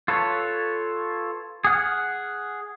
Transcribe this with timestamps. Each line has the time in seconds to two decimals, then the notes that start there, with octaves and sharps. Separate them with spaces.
0.08 F4 A4 B4 C#5
1.64 G#4 F#5 F6